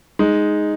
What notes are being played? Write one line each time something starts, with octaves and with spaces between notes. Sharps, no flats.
G#3 D#4